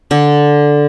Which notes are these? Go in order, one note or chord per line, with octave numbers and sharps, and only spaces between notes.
D3